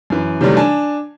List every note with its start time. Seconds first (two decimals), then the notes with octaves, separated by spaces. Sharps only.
0.10 F#2 E3
0.41 C3 D#3 E3 F#3 G3 A3
0.57 D4 G#5 A5